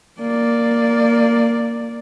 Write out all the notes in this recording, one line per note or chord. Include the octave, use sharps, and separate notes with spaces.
A#3 D5